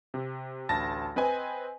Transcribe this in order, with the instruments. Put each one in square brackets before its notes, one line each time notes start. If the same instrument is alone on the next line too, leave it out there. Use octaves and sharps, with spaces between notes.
[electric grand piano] C3
A1 D2 A5 A6 A#6
C4 B4 D#5 G#5